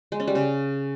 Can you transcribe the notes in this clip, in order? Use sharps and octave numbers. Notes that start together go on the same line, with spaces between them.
G#3
C#4
G3
C#3